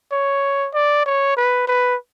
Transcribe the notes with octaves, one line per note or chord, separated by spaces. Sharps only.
C#5
D5
C#5
B4
B4